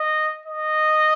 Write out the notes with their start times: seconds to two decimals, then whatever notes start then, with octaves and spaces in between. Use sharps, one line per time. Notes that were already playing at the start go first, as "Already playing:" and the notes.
Already playing: D#5
0.46 D#5